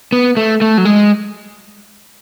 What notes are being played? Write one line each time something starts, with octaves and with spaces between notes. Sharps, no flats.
B3
A3
A3
F#3
G#3